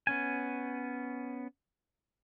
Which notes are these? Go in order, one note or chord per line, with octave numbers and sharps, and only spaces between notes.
B3 C#4 G#5